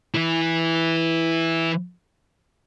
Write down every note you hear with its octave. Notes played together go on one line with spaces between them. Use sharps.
E3 E4